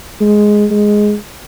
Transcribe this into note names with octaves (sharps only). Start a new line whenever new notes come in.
G#3
G#3